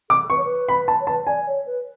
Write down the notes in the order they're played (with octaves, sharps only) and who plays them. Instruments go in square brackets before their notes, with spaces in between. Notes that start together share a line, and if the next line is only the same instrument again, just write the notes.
[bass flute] A4 [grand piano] D6
[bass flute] B4 [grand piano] C#6
[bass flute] C#5
B4
[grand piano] B5
A5
[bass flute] C#5
[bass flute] B4 [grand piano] A5
[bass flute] D5 [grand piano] G#5
[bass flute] C#5
B4